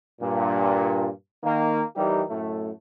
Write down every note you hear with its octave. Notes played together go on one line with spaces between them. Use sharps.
G2 A#2
D#3 A#3
E3 G3 D#4 G4 A#4
F#2 A2 A3